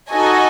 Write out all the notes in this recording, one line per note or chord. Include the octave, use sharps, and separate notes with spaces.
D#4 F#4 A4 D#5 G#5